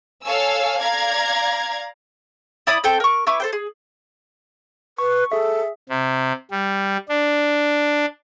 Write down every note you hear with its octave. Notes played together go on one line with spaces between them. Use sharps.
A4 C#5 F5 G#5 E6
D5 F5 A#5 G#6
E4 D5 B5 D#6
C4 A4 G5 G6
A#4 C#6
E4 B4 C#6 D6
A4 C5 G5
G#4
B4 C#6
G#4 A4 E5
C3
G3
D4